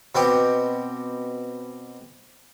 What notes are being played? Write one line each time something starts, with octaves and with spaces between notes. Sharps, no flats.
B2 C4 G4